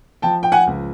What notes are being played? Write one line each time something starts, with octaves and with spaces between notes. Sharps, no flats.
F3 G5 A5
G5
F#5 G#5
C#2